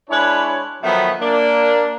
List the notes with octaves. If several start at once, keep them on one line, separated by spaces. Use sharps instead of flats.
G#3 D4 E4 B4 C#5
D#3 F3 F#3 A3 B3
A#3 D4